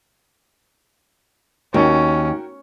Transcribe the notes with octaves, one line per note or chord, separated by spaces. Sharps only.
D#2 C#4 F#4 A#4 G5